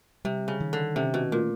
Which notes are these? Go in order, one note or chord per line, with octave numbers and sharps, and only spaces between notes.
C3 G3
C#3
D#3
D3
C3 C#4
B2
A#2 A3